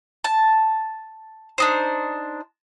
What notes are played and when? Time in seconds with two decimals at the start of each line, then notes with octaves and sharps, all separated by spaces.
0.24 A5
1.58 D4 D#4 C5